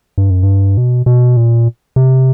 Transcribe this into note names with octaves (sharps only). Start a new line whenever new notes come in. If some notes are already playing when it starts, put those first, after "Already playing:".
G2
F#2
G2
B2
B2
A#2
C3